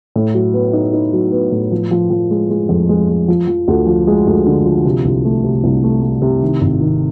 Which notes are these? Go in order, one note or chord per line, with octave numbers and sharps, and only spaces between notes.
A2
F#3
B3
D#4
D#4
F#3
B3
A2
F3
F3
F3
G#3
G#3
F2
G#3
G#3
F3
F3
D2
F3
G#3
D2
D3
F3
C3
C2
A3
C3
C2
A3
A3
C3
D#3
G#1
D#3